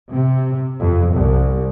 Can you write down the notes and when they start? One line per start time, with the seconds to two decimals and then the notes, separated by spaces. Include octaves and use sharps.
0.10 C3
0.80 F2
1.14 C2